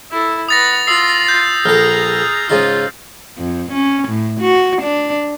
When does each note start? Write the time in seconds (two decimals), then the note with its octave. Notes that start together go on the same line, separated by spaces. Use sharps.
0.11 E4 A4
0.49 B4 F#5 D#6 A6 A#6
0.87 F4 C6 D#6 E6 C7
1.28 G6
1.65 A#1 G#4 A4 A#5 F6
2.49 G#2 C#3 D#4 F4 G#4
3.38 F2
3.72 C#4
4.08 A2
4.41 F#4
4.82 D4